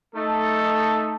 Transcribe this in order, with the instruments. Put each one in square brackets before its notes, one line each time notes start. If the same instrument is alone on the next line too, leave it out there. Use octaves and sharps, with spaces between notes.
[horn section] A3 D#4 A4